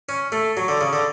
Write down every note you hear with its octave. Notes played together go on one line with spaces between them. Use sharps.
C#4
A3
F#3
D3
C#3
D3